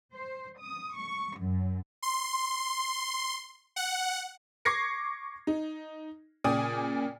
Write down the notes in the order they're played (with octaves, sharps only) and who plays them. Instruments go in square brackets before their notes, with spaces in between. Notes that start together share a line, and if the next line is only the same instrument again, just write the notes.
[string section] C5
D#6
C#6
F#2
[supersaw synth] C6
F#5
[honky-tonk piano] C#6 D6 G#6 A#6 C7 C#7
D#4
A#2 C#3 D5 G5 G#5 D#6